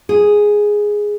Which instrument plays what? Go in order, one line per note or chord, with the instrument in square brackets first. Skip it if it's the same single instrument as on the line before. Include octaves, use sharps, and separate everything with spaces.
[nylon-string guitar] G#4